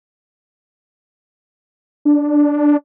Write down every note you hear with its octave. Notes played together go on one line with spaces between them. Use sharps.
D4